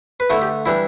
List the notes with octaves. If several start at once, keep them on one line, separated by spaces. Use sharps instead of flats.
B4
D3 A3 E4 A4
G4
E3 G3 D4 E4